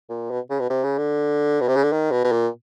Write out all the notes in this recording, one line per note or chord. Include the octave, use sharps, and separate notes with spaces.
A#2
B2
C#3
B2
C3
C#3
D3
B2
C3
C#3
D3
D#3
B2
B2
A#2